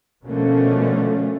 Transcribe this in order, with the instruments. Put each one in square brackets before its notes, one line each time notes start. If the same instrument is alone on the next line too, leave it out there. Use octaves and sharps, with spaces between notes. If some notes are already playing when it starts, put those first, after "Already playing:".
[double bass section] B2 D3 F3 A3 A#3 C#4